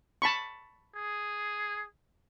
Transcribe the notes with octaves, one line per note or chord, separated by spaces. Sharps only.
A5 B5 C#6
G#4